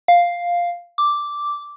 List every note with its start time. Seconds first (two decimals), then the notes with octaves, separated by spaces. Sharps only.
0.08 F5
0.98 D6